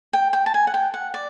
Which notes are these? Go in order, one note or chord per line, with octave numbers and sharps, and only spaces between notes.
G5
G5
A5
G#5
F#5
G5
F#5
D5